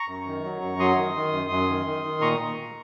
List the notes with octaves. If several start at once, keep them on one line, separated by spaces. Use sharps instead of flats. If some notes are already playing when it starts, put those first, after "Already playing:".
Already playing: A#5 C#6
F#2
D#3
F#3
F#2
F#3 C6 D#6
D#3
D#3
F#2
F#2
D#3
D#3
D#3
A#2 A#5 C#6
A#2
A#2